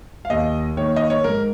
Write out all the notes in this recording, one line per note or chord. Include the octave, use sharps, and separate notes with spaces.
F5
D#2 D#5
D#3 A#3 C#5
D#5
C#5
G#2 A#4